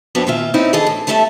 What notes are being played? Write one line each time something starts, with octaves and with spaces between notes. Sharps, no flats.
F2 F#3 B3 C4 D4
A#2 D#3 F4 E5
C4 C#4 D#4 E4
D#3 E3 G#4 A4 D#5
A2
C#3 G3 A3 A4 D#5 E5